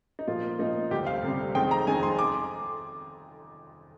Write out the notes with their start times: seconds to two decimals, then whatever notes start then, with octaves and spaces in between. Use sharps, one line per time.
0.19 D#4
0.27 A#2 F3 A#3 F4
0.59 A#2 F3 A#3 D#4
0.91 D2 C3 G3 C4 G4
1.07 F5
1.23 D2 C3 G3 C4
1.55 F2 D#3 G#3 C4 G5
1.71 A#5
1.87 F2 D#3 G#3 C4 G#5
2.03 C6
2.19 D6